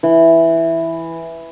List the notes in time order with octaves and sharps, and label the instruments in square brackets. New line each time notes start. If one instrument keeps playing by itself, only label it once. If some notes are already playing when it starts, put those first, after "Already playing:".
[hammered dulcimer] E3